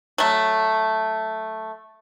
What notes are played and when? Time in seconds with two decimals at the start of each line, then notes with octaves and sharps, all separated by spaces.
0.18 F#3 A3